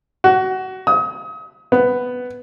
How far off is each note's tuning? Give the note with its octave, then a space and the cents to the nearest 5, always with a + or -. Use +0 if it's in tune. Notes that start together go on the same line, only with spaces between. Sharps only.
F#4 +20
D#6 +35
B3 +10